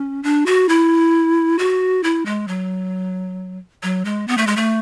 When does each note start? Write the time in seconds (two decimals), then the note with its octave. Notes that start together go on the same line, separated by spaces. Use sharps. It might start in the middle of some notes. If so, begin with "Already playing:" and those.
Already playing: C#4
0.23 D4
0.46 F#4
0.69 E4
1.59 F#4
2.03 E4
2.26 G#3
2.48 F#3
3.83 F#3
4.05 G#3
4.28 B3
4.38 A3
4.47 G#3
4.57 A3